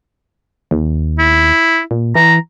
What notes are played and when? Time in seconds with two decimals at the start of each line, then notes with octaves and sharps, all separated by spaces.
0.71 D#2
1.19 E4
1.91 A#2
2.15 E3 A#5